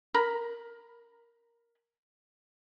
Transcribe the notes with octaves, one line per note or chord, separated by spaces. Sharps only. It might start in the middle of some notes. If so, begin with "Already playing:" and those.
A#4 A#5 B5